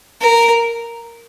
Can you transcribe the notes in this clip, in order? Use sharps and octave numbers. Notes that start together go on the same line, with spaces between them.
A#4